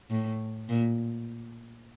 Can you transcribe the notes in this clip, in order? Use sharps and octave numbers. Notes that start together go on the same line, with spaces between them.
A2
A#2